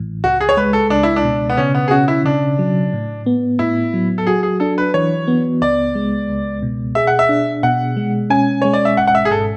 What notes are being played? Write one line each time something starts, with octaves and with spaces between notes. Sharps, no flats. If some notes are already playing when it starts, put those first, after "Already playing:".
Already playing: A1 A2 E3
C#2 F#4
G#4
C#5
G#3 B4
A4
C#2 D4
E4
D4
B2
B3
C#3 C#4
B3
G#4
C#4 F#4
E4
C#3 D4
F#3
A2
B3
A2 E4
F#3
A4
F#4 G#4
G#4
D4 A4
B4
E3 C#5
B3
C#2 D5
G#3
C#2
B2
G#4 E5
F#5
E5
D4
B2 F#5
G#3
C#4 G#5
G#3 C#5
D5
E5
G#1 F#5
F#5
E5
G#4
G#2 A4